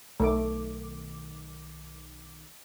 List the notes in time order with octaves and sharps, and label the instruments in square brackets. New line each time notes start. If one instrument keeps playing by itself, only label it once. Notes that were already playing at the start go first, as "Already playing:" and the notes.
[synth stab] B1 D#3 D6 [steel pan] A3